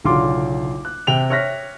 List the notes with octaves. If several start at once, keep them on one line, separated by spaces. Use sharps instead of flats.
F#1 B1 D3 F4 C6 D6
F#6
C3 G5 F7 F#7
C#5 E5 F6 F#6 A#6 B6